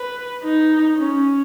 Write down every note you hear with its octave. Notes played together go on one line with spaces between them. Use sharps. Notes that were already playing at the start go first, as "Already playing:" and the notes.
Already playing: B4
D#4
C#4